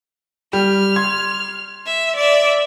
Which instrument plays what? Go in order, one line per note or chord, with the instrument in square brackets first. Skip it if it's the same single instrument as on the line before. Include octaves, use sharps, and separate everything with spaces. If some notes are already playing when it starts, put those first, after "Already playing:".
[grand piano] G3 [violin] F6
[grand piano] C6 G#6
[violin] E5
D5 E5